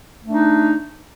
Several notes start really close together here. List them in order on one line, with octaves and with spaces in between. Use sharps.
A3 D4 D#4